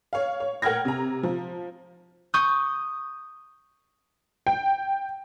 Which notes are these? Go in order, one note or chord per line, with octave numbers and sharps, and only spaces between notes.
C#5 F5
C#5
A#4 F#5 G5 F6 G#6 A#6
C3 A#5
F3
C#6 D#6 G6
G5